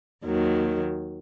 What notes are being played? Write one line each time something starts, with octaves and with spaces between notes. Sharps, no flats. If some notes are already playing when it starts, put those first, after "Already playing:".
D#2 D#3 F#3